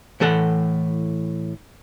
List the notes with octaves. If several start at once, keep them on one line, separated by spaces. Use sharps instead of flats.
A2 E3 A4 F#5